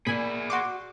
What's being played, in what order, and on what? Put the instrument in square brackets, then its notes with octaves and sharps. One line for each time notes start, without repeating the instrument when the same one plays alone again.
[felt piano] A#2 [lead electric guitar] G#4 D5 [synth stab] G#5 B5
[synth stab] F#4 C6 D6